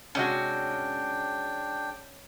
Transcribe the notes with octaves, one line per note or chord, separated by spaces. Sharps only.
C3 G#3 C#4 D4 F#4 G5